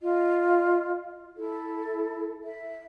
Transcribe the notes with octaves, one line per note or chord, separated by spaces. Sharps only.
F4 D#5
E4 A4
E5